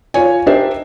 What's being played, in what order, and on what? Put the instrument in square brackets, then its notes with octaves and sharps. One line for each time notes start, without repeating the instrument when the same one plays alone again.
[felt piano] F4 C#5 G#5
D4 D#4 G4 A#4 C5 E5